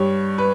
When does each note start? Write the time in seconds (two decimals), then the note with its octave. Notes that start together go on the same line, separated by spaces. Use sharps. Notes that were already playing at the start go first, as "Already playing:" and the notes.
Already playing: G2 G3 C#5
0.38 B4